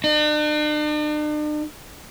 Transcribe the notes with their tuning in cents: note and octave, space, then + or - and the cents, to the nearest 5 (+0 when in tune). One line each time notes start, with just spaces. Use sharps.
D4 +45